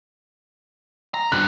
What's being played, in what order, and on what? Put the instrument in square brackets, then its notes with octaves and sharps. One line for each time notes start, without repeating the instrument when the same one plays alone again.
[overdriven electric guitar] A#5
[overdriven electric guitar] G2 D3 [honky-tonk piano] F#6